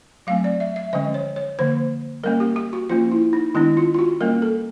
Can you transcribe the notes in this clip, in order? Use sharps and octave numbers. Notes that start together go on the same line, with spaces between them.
F#3 A3 C4 F5
D5
E5
E5
D3 F3 G#3 C#4 D#5
C#5
C#5
D3 F3 A#3 C5
G3 A#3 C#4 A#4
G4
G4
F#4
F3 A#3 C#4 F4
E4
D#4
D#3 G#3 B3 D4 E4
F4
F4
F#4
G3 A#3 C#4 A#4
A4